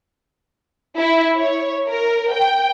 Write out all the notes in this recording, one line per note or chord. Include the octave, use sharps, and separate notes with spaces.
E4
C#5
A#4
G5